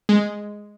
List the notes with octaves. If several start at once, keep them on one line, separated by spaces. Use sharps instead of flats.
G#3